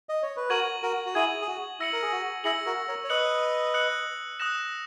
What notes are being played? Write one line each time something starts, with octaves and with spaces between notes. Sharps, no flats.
D#5
C#5
B4
F#4 A#4 C#6 G#6 D#7 F#7
F#4 A#4
F#4
E4 G#4 C#6 G#6 D#7 F#7
G#4
F#4
E4 E6 A#6 C#7 F#7
A#4
G#4
F#4
E4 G#4 E6 A#6 C#7 F#7
F#4 A#4
A#4 C#5
C#5
B4 D#5 D#6 F#6 C#7 F#7
D#6 F#6 C#7 F#7
D#6 F#6 A#6 E7